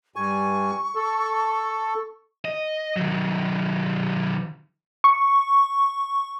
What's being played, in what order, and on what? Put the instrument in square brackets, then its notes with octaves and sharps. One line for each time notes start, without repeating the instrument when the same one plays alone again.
[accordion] G2 G#5 [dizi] C#6
[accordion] A4
[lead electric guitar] D#5
D#3 F#3
[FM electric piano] C#6